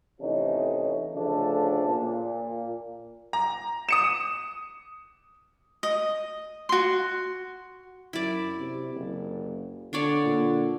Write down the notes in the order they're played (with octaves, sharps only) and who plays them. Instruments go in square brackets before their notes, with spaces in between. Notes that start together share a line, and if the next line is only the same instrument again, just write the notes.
[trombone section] A2 C3 E3 F3 C#4 D#4
D2 C#3 F3 A3 D4
A#2
[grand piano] A#5
D#6 C#7 E7
[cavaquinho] D#5
F#4 C6
[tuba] F#2 [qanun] E4 D5
[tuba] C3
F#1
[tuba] D3 [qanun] D4 C#5 D5
[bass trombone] A#2